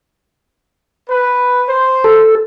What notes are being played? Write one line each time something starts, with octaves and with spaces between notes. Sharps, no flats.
B4
C5
A4